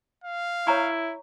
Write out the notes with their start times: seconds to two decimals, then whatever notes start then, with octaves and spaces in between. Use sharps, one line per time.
0.24 F5
0.67 E4 C#5 A#5 C#6